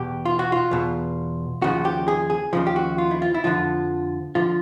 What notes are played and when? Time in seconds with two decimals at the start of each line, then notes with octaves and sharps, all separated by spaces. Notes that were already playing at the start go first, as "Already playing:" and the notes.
Already playing: E2 B2 G4
0.25 F4
0.39 F#4
0.52 F4
0.71 E2 B2
1.62 D#2 C#3 F3 F#4
1.85 G4
2.08 G#4
2.30 G#4
2.53 D#2 C#3 F3
2.67 G4
2.76 F#4
2.98 F4
3.11 E4
3.22 F4
3.34 E4
3.44 F2 D3 F3 F4
4.35 D3 F3 F4